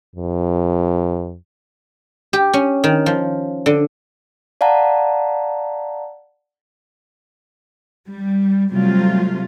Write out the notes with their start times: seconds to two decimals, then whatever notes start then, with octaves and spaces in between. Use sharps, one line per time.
0.16 F2
2.33 G4
2.54 C#4
2.84 D#3
3.06 F3
3.66 D3
4.61 D5 F5 F#5 A5 A#5
8.08 G3
8.72 C3 F#3 G3 A3 C4 F4